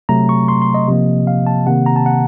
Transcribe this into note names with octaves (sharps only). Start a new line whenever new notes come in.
C3 F#3 A3 A#5
C#6
C6
C6
D#5
C3 F3 A#3
F5
A5
C3 D#3 A#3 F#5
A#5
A5
F#5